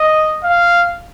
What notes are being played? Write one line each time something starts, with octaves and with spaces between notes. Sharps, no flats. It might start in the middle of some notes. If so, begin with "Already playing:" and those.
Already playing: D#5
F5